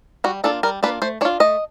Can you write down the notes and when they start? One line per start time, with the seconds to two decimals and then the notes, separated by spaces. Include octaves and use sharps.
0.24 G3 F#4
0.44 A#3 D4 F4 A4
0.63 G3 A#4
0.83 A#3 D4 F4 B4
1.02 A3 C5
1.21 D4 C#5
1.25 F4
1.40 A3 D#5